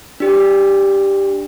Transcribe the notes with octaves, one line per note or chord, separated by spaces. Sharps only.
D4 G4